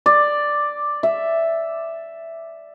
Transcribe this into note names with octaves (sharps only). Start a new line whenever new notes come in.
D5
E5